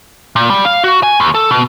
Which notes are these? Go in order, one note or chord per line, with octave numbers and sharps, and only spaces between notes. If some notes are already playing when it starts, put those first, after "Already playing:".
A#2
G3
F5
F#4
G#5
D#2
A4
B2